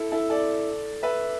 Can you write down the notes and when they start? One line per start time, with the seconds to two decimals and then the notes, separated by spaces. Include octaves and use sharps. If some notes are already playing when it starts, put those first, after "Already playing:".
Already playing: E4 A4
0.12 E4 A4
0.30 A4 D5
1.03 B4 E5